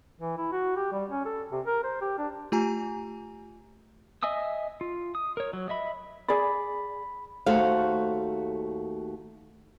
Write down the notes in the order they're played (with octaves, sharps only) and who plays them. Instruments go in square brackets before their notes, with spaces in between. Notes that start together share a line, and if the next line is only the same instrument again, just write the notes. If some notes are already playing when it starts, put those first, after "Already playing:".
[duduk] E3
E4
F#4
G4
G3
C#4
A4
C3
A#4
C5
G4
D4
[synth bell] A3 F4 G4 G#5 A#5
[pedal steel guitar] D#5 E5 G#5 D#6 E6
F4
D#6
A#4 C#5
F#3
D#5 E5 B5
[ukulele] G#4 D5 [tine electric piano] B5
[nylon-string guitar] D#2 A3 F#4 A4 C5 F5